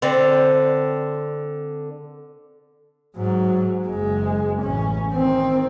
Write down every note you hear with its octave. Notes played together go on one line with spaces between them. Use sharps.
D3 C4 D5
G#2 F#3
F#1 G#3
A1 C#4
D#3 C4